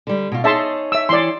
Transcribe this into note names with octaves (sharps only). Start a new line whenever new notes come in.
D3 G3
B2 F4
D#4 G#4 C#5 E5 A5 C6
E5 E6
E3 E4 C#5 D5 C6